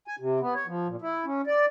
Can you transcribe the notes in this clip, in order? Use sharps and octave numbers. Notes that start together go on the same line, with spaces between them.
G#5
C3
B3
C#5
F3
A#2
E4
C#4
D5